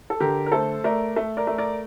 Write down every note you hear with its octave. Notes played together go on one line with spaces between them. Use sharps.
A4
D3 G4 A#4
A#4
A3 A4 C5
A3 A#4 D5
A3
A#4 D5
A3
A#4 D5